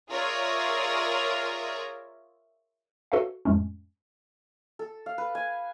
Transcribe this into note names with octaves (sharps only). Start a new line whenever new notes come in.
F4 G#4 A#4 C#5 D5 E5
F#4 A4 B4 C#5 E5 F5
F2 A2 G#3 A3 C#4
A4
F5
B4
G#5